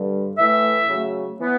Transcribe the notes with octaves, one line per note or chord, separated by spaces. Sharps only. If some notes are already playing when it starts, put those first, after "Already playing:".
Already playing: G2 D3 G3
A2 E3 A3 E5
C#3 F#3 A3
E3 B3